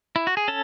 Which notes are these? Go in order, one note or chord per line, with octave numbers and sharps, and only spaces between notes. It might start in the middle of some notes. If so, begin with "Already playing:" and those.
E4
F#4
G#4
C#4 A4